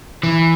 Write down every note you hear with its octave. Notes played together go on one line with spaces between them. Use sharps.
E3